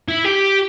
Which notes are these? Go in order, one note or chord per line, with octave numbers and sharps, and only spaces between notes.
E4
G4